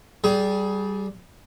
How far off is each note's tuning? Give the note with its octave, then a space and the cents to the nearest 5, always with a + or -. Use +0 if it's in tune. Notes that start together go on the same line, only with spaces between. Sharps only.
G3 -10 G#4 +20